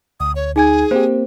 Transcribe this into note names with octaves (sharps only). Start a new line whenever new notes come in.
D2 D#6
C#5
D#4 G#4 G#5 G#6
A#3 C4 G4 C5